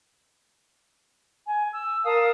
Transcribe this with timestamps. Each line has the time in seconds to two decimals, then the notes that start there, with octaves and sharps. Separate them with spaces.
1.46 G#5
1.73 E6
2.05 A#4 F5 A5 D#6